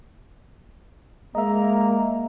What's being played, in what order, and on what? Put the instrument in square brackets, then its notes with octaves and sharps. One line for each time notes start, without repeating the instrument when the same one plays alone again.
[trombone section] G#3 A#3 [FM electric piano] D#5 E5 [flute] A#5